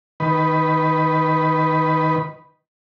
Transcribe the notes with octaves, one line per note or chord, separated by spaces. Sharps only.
D#3 B4